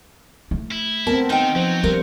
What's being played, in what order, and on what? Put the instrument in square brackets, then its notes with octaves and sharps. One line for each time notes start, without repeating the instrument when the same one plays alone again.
[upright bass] A3
[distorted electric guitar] E4
[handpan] B3 C4 [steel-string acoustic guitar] A#4 A5
[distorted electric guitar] D#3 [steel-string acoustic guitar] D#4 G5
[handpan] F3 C5 [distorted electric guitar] F#3
[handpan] G3 [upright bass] D4 [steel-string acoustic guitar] A#4